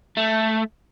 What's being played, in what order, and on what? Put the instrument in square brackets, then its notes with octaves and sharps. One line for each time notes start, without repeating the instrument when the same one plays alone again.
[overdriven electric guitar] A3